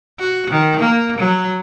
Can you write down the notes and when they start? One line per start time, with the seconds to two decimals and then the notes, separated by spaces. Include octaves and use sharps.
0.20 F#4
0.50 D#3
0.80 A#3
1.19 F#3